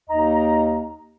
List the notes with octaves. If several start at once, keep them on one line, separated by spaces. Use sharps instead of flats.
D#2 D#4 D#5 A#5